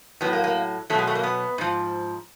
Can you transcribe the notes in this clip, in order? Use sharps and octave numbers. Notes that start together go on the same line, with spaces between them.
A2 F#3 B3
A#3
A#3
B2 F#3 A3
G#3
A3
A#3
B3
G#2 F3